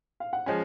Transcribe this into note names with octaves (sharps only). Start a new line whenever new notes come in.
F5
F#5
F3 G#3 C#4 G#5